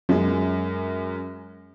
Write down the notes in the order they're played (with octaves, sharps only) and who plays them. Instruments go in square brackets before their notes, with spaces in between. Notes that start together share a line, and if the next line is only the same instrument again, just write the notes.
[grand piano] F#2 G#3 [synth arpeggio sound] F#3 C#4 F4